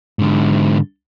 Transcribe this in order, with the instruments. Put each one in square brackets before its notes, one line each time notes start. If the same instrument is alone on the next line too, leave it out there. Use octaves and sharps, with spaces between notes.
[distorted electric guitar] G#2 D3